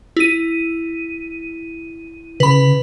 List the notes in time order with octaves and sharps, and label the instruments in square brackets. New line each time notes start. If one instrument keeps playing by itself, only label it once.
[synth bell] E4 D#7
[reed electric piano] C#3 [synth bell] B4 B5